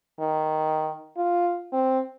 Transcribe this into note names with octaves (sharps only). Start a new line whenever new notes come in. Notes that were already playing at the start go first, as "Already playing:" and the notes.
D#3
F4
C4